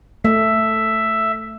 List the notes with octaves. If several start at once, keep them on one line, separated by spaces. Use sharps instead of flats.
A3 E5